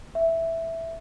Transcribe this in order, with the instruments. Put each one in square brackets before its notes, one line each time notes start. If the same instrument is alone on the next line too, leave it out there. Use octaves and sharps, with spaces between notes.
[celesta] E5